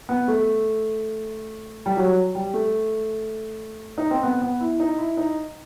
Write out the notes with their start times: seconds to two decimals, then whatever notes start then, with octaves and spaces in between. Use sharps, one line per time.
0.09 B3
0.28 A3
1.86 G3
1.97 F#3
2.35 G3
2.54 A3
3.98 D#4
4.11 C4
4.23 B3
4.42 B3
4.61 E4
4.80 D#4
4.99 E4
5.17 D#4